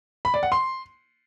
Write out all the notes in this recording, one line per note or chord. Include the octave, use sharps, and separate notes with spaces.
B5
D5
F#5
C6